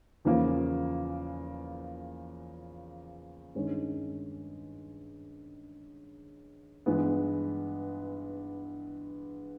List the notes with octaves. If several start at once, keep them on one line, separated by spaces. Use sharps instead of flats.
E2 C#3 F3 A#3
G2 D#3 G#3 C#4
G2 E3 G#3 B3